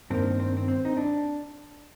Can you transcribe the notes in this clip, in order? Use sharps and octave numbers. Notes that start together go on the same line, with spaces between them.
G2 D#3 A#3 C4
C4
C4
C4
D#4
D4